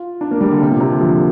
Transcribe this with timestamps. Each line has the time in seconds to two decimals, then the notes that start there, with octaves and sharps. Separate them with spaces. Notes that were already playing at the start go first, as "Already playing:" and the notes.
Already playing: F4
0.21 D4
0.31 A#3
0.41 G3
0.51 D3
0.61 C3
0.71 A#2
0.80 C3
0.91 D3
1.01 F3